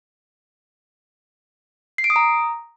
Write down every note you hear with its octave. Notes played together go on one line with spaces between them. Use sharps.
C7
D7
D#6
A#5